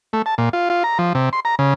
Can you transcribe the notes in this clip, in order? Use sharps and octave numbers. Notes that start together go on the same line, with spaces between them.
A3
A5
A#2
F4
F4
A#5
F3
C3
C6
A#5
C#3